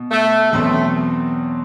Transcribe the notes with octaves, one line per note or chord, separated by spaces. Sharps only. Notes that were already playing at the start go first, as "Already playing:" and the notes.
Already playing: B2
A3
E2 B2 F#3 A3 C4